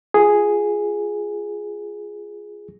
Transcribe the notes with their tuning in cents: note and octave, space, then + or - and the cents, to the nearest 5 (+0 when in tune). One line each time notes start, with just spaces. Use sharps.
F4 -5 G#4 +0